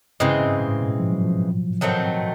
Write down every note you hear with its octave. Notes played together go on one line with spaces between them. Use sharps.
G2 C#3 E3 G#3 C4
G#2
A2
B2
F3
F#3
F3
D#3 F#3 A3 C4